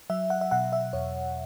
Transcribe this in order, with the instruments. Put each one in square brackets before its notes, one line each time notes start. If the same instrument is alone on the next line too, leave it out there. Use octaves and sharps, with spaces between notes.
[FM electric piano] F#3 E5
F#5
E5
B2 F#5
E5
E2 C#5